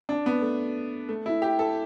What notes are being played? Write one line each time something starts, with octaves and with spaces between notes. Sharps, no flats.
D4
B3
A3
A3
E4
G4
A4